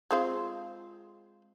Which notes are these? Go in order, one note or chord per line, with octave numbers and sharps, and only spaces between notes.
G#3 C4 F4